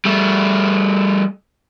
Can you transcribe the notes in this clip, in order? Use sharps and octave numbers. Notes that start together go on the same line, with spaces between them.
G3 A3